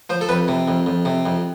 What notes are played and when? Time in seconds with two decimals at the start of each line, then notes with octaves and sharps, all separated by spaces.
0.10 F3 C5
0.21 A4
0.29 F2 B4
0.48 C3
0.68 F2
0.86 F2
1.05 C3
1.25 F2